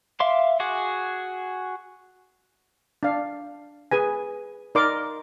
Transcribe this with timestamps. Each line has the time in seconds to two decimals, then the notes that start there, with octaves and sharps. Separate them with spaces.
0.20 E5 F5 C6 D6
0.60 F#4 G#4 F#5 D6
3.03 D4 F5
3.91 G#4 B4 G#5
4.75 D#4 A#4 D5 D#5 C6 D6